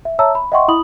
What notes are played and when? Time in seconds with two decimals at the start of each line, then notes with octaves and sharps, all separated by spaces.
0.05 E5
0.19 C#5 E5 A5 A#5 E6
0.35 B5
0.52 D#5 E5 F#5 G5 C6 C#6
0.68 E4 B5 D#6 F#7